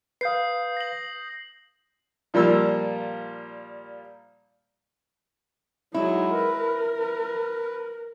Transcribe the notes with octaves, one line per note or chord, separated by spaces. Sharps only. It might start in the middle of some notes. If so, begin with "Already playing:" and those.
B4 F5 D#6 G6 C7
A#6 F#7
A#2 F3 G3 A#3 E6
F#3 G#3 D#4 E4
A#4 B4
B4